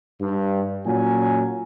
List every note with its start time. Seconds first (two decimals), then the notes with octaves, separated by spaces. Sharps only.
0.21 G2
0.86 A#2 F#3 C#4 G#5